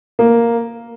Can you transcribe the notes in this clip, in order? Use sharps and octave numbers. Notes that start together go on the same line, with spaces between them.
A#3